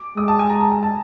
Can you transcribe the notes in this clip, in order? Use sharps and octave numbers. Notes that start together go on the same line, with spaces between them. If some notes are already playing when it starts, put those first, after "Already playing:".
Already playing: D6
G#3 D#6
A5
G#5
A#5
A5
G#5
A5